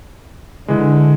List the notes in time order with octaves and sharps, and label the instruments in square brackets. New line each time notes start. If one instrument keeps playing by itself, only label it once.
[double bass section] D3 [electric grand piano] E3 G#3